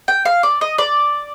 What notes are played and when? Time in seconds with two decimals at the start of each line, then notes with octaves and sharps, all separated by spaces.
0.08 G5
0.25 F5
0.43 D5
0.61 D#5
0.78 D5